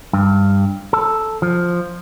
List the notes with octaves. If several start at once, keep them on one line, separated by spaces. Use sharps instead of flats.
G2
A4
F3